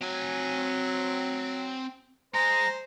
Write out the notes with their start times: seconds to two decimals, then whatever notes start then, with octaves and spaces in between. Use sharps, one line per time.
0.02 F#3 C4 G#5
2.34 G#3 C5 A#5